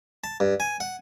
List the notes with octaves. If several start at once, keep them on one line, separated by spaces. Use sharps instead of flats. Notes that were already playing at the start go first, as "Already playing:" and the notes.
A5
G2
G#5
F#5